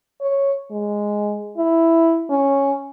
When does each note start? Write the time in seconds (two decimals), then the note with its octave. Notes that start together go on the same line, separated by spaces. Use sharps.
0.21 C#5
0.71 G#3
1.57 E4
2.30 C#4